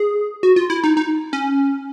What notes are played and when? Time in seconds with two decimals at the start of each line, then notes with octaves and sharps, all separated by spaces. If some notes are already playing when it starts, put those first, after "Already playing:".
Already playing: G#4
0.43 F#4
0.56 F4
0.70 E4
0.84 D#4
0.97 D#4
1.33 C#4